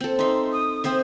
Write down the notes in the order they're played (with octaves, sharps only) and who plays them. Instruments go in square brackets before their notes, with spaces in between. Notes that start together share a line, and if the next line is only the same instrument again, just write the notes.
[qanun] C4 A4
[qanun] D#4 E5 [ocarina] C6
[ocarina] D#6
[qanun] C4 C5 E5